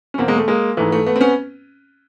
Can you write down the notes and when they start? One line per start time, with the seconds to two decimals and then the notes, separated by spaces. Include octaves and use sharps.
0.14 C#4
0.18 E2 B2 A#3 C4
0.28 G#3 A#3
0.38 A3
0.48 G#3 A#3
0.77 G#2 E3 A3
0.92 A3
1.06 A3 B3
1.16 C4
1.21 B3 C#4